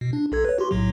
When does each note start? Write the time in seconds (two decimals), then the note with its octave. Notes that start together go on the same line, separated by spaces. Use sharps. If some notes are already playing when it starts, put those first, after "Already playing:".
0.01 B2
0.13 D4
0.32 B1 A4 G#6
0.45 B4 C#5
0.58 F#4 G4 C6
0.71 B1 A2 F#3